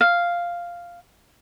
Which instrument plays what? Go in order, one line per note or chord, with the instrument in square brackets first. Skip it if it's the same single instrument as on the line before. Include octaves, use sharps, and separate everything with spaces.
[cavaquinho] F5